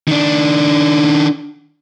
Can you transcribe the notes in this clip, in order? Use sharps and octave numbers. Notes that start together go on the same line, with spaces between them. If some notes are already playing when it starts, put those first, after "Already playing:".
D#3 D4